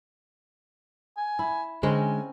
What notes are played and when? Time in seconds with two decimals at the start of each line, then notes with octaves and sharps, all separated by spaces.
1.17 G#5
1.39 E4
1.83 D3 G#3 C4 C#4 A#4 G#5